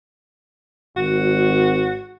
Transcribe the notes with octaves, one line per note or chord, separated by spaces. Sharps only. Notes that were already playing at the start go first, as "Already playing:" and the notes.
G#1 F#4